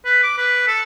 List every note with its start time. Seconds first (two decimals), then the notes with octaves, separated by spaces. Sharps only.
0.05 B4
0.23 D6
0.38 B4
0.67 A4